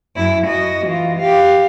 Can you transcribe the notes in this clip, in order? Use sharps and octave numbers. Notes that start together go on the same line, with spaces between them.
F#2 E4
F#4 D#5
E3 F4
G4 F5